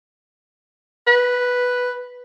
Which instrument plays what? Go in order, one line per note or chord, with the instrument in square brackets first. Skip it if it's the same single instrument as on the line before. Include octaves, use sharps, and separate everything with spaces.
[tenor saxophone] B4